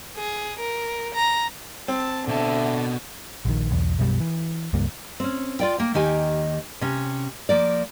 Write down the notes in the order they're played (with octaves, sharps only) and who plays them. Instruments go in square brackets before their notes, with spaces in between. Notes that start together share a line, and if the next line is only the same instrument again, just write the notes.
[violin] G#4
A#4
A#5
[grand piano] C4 [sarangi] A5
[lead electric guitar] B2 A5 [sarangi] D3 [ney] E5
[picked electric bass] A#1 D#3
B1 E2
B1 F#2 B2 G3
E3
C#2 G2 G3 A#3
[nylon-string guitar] C4 C#4
F4 D5 G5
A#3 G5
D#2 D#3 G4 G#5
C3 C#4
F3 A#3 D5